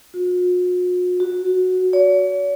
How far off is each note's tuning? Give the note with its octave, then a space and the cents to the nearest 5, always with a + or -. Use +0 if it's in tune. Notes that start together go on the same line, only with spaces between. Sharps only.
F#4 -45
F#4 -5
C#5 +45